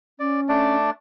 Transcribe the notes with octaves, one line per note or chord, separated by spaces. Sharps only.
C#4 D5
A3 D4 D5